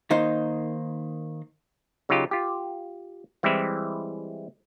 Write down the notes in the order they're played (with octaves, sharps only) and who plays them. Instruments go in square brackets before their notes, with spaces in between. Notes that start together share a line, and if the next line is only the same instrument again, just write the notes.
[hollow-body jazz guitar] D#3 A#3 D#4 C5
[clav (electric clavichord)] C#3 F#3 D#4 F4 G4
F4 G4
E3 G3 G#3 C4 E4